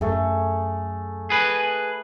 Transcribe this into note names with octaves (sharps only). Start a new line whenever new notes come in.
F#2 A3 G#4
G#4 B4